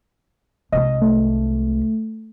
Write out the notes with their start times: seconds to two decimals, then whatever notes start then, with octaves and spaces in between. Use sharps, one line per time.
0.72 C2 G#3 D#5
1.02 A3